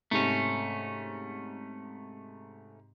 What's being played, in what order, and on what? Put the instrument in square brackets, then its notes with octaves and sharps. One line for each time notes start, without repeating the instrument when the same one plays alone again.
[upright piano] G#2 C3 [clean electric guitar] A3 C#4